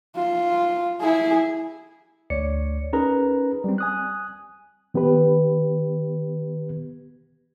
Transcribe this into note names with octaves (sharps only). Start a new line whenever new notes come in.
F4
E4 G#4
D2 C#5 D5 C#7
C#4 D#4 G#4 A#4 B4 A#5
G3 C4
G#5 D#6 F#6
D#3 B3 G4 B4